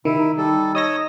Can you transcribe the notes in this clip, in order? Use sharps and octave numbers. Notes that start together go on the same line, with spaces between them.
C3 D#3 E4
D#4
G3 A4
C#5 D#5 D#6 E6 A#6